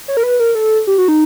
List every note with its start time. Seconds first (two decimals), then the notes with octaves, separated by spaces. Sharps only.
0.08 C#5
0.17 A#4
0.23 B4
0.40 A#4
0.55 A4
0.87 G4
0.98 F#4
1.08 D#4